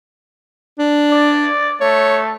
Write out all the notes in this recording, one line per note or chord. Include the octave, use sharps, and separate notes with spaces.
D4
D5
A3 C#5